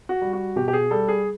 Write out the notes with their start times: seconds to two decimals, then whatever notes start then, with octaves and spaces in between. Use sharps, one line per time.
0.09 F#4
0.22 G3
0.33 F#4
0.56 B2 G4
0.68 G4
0.73 G#4
0.91 G3 A4
1.08 G#4